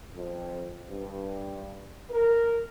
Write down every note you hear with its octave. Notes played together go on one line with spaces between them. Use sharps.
F2
G2
A#4